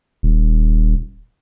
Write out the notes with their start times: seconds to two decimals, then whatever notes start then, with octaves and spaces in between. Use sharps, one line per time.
0.23 D#1